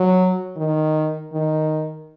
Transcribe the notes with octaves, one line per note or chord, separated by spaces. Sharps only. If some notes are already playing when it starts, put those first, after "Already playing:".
Already playing: F#3
D#3
D#3